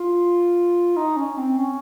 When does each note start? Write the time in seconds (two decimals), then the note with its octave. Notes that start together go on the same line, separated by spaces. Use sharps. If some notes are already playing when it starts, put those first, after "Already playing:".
Already playing: F4
0.96 D#4
1.17 C#4
1.37 C4
1.58 C#4